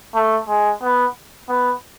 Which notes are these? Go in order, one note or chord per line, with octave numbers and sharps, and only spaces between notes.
A3
G#3
B3
B3